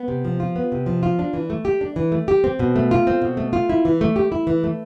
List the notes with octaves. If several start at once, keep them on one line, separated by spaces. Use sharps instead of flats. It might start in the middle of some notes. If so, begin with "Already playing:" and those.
Already playing: B3
C3
F3
F4
B3
C3
F3
F4
D4
E3
A3
G4
D4
E3
A3
G4
C4
B2
A3
F4
C4
B2
A3
F4
E4
E3
A3
G4
E4
E3
A3